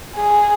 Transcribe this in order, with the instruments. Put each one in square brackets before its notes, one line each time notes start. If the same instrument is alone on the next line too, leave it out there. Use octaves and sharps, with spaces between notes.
[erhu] G#4